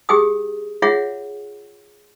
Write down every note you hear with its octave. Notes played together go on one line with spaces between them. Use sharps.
G4 G#4 G5 D#6
F4 G#4 C#5 E5 F#5